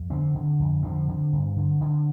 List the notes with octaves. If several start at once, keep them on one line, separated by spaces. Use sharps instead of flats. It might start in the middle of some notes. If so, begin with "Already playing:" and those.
Already playing: F2
D3 C4
D3
F2
D3 C4
D3
G2
D3
D3